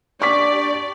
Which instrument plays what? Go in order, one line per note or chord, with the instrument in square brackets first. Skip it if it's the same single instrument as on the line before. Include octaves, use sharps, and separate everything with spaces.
[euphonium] D4 [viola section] G4 D5 [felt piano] C#6 D6 B6